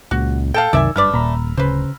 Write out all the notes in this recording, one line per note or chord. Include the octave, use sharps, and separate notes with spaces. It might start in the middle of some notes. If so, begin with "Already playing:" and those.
C#2 A#2 F#4
A4 F5 G5 A5
C2 F#2 C3 D#3 D5 E5 G#5 E6
F#1 G2 A3 B4 D5 F6
D#1 A#2 A#5 B5
D1 C#3 B4 C5